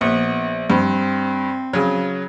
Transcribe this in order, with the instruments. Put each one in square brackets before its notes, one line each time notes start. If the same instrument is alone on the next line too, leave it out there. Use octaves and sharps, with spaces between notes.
[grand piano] A#1 [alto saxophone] B3
[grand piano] G2 [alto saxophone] C4
[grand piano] C#3 F#3